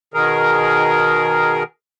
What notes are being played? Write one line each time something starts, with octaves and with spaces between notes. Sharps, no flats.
B2 D#3 G#4 A#4